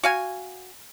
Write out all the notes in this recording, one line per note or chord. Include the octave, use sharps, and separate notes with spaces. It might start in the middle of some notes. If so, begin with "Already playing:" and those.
F#4 F5 G#5